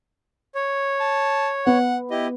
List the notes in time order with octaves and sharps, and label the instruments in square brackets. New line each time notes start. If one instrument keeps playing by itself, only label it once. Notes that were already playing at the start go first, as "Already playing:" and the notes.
[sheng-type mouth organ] C#5
[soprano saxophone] A5
[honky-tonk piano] B3 [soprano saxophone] F#5
[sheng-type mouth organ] E4 G4 [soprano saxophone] D#5